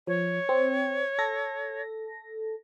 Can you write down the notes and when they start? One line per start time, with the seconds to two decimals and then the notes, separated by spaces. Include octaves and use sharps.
0.07 F3 C#5
0.49 C4
1.19 A4 A#6